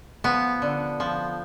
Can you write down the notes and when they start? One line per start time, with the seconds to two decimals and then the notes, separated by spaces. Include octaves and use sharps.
0.24 F3 B3
0.62 D3
1.00 F3